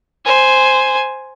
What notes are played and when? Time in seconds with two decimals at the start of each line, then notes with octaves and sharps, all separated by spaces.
0.25 C5 G#5